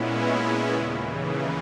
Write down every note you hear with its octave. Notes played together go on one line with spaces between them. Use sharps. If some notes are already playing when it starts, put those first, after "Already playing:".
Already playing: A#2 G#3 B3 C#4 E4
D#2 C#3 E3